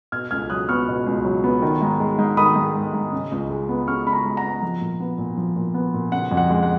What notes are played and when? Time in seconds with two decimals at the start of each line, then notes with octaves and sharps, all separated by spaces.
0.12 B2 F6 G#6
0.31 C#2 F6 G#6
0.50 F#3 D#6 F#6
0.69 B3 C#6 F6
0.88 B2
1.06 C#2
1.25 F#3
1.44 B3
1.62 D#3
1.82 G#2
2.00 G#3
2.19 G#2
2.37 D#3 B5 D#6
2.56 G#2
2.74 G#3
2.94 G#2
3.12 C#3
3.32 C#2
3.50 G#3
3.69 B3
3.87 C#3 C#6 F6
4.06 C#2 B5
4.12 A#5 C#6
4.25 G#3
4.37 F#5 A#5
4.44 B3
4.62 F3
4.81 A#2
5.00 B3
5.18 A#2
5.37 F3
5.56 A#2
5.74 B3
5.94 A#2
6.12 C#3 F#5
6.31 F2
6.37 F#5
6.50 G#3
6.63 F#5